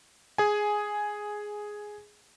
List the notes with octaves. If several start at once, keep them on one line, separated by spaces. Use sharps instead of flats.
G#4 G#5